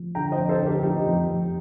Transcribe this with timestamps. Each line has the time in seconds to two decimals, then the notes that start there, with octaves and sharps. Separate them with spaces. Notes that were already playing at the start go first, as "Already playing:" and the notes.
Already playing: F3
0.15 D3 G5 A#5
0.32 C5 D#5
0.38 F2
0.49 A4 C5
0.60 D3
0.66 G4 A#4
0.83 F3 D#4 G4
1.06 F2
1.28 F2